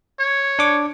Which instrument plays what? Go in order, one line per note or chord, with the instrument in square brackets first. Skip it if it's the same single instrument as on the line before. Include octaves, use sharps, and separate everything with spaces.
[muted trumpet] C#5
[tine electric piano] D4 D6